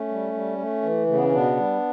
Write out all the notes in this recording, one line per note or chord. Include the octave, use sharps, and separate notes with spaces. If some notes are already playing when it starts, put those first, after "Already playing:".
Already playing: A3 C#4
G3
G3
A3
E3
C#3 A3
B3
C#4
B2 B3 D4
G3